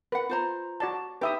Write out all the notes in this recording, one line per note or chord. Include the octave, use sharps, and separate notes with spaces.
A#4 B4 F#5
F4 C5 A#5
F#4 D5 A5
D#4 G4 B4 E5 D#6